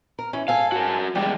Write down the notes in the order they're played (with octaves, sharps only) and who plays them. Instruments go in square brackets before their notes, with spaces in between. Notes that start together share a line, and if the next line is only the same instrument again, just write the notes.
[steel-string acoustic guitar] A#4
E3 C#4
[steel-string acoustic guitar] G#2 A4 G#5 [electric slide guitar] F5
[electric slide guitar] F#4 A#4
[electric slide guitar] E2 G3 G#3 [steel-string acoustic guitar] D5 G5